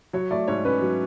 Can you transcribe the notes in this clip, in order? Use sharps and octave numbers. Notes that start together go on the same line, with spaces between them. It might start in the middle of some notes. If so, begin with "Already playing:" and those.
F#3 C#5
A3 D5
G#2 C#5
C#4 B4
F#3